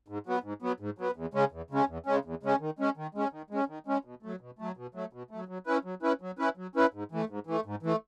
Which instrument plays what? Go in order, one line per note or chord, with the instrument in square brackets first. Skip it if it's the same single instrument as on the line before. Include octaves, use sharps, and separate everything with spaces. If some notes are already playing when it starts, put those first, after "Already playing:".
[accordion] G#2
F#3 B3
G#2
F#3 B3
G#2
F#3 B3
E2
C#3 G#3 C#4
E2
C#3 G#3 C#4
E2
C#3 G#3 C#4
E2
C#3 G#3 C#4
D#3
G#3 C#4
D#3
G#3 C#4
D#3
G#3 C#4
D#3
G#3 C#4
B2
F#3 A3
B2
F#3 A3
B2
F#3 A3
B2
F#3 A3
F#3
C#4 E4 B4
F#3
C#4 E4 B4
F#3
C#4 E4 B4
F#3
C#4 E4 B4
G#2
E3 A3
G#2
E3 A3
G#2
E3 A3